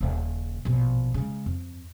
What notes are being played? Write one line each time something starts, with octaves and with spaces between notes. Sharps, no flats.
D#1 C#3
A#1 B2
C#3 G#3
F2